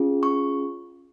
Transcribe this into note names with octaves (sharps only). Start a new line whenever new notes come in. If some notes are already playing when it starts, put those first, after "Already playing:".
Already playing: C#4 F4 G#4
C#6